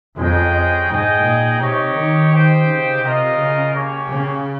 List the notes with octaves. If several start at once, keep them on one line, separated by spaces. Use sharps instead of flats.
F2 G#3 C#4 G#4 D#5 G5
G#2 D#4 G#4 D#5 G5
A#2
C3 D#4 G4 C#5
D#3
D#4 G4 C5 G5
C#3
C3 F4 A#4 D#5
C#3
A#3 C#4 G4 C#5
C#3